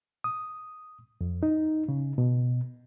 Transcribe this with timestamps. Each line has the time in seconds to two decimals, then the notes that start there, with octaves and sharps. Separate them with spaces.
0.24 D#6
1.21 F2
1.43 D#4
1.89 C#3
2.18 B2